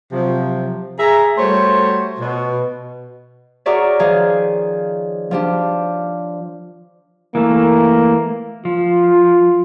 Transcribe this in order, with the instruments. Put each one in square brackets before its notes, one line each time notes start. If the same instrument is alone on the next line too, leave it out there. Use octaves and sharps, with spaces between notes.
[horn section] C3 F3 F#3
G#4 E5 A#5
G3 A3 F#4 C5 C#5
B2
[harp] F#4 G#4 A#4 C#5 D5 E5
D#3 F3 G#4 F5
F3 D4 G4
[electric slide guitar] E3 A3 [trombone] A#3
[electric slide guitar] F3 [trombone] F4